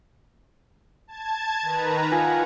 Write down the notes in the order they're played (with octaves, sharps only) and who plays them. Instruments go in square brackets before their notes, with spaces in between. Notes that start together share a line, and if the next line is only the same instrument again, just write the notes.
[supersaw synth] A5 G#6
D#3 B4 A#5
[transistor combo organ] F4 G#5 [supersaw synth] F#5